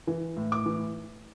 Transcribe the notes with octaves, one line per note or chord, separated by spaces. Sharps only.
E3
A2
D6
E3